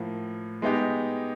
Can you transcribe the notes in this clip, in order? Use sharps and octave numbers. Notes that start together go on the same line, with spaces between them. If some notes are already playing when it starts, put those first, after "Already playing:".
Already playing: A2 F3 A#3
G#3 B3 D#4 G4